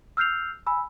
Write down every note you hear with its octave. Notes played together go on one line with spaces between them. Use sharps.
E6 F6 G6 C7 F7
G#5 B5 E6